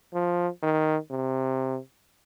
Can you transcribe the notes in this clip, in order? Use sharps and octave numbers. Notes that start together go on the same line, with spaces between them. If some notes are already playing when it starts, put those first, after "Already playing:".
F3
D#3
C3